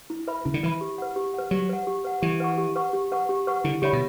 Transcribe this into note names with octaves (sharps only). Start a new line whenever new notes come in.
E4
B4 E5 B5
C#3 E4
D3
E3 B4 E5 B5
G4
B4 F#5
G4
B4 F#5
F#3 G4
B4 F#5
G4
B4 F#5
E3 G4
B4 F#5 C#6
G4
B4 F#5 C#6
G4
B4 F#5 C#6
G4
B4 F#5 C#6
D3 E4
D3 G4 C#5 E5 B5
B2